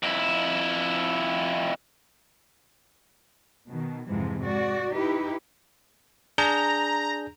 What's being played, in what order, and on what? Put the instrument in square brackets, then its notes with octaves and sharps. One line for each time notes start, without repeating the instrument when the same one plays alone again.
[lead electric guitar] F2 E4
[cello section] B2 D#3
F2 G#2 C3 E3 F3 G#3
G#3 F#4 D5
D#4 E4 G4 B4
[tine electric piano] D4 G#4 G6 [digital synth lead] A#5